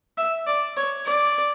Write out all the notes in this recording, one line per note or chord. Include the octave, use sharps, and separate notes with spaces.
E5
D5
C#5
D5